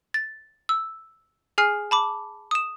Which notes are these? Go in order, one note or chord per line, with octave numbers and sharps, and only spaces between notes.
A6
E6
G#4 G#5 F6 C7
A5 B5 D6
D#6 E7